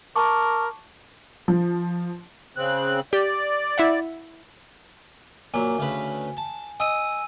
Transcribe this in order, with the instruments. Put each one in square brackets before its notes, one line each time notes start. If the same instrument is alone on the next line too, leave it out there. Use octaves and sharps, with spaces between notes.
[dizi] A#4 [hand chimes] A5 C#6 D6
[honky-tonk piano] F3
[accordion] C#3 C4 F#6
[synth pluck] G4 [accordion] D5
[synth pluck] E4 E5 F#5
[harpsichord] A#2 F#3 [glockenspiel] G#5
[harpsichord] D2 C#3 B4
A5
[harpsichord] D#5 [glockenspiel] G#5 E6 D#7